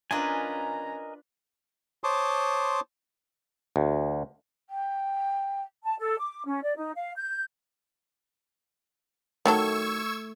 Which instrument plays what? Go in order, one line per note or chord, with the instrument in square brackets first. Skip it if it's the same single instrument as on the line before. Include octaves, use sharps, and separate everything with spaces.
[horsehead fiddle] C#4 A#5 [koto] D4 F4 B4 [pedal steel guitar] A#4 D#5 G#5
[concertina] C5 C#5 A5 C6 D6 D#6
[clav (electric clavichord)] D2
[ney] G5
[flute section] A5
A4
D6
C#4
D5
D#4
F5
G6
[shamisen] D#3 F#3 A4 [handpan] A3 [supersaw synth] C#6 E6 G#6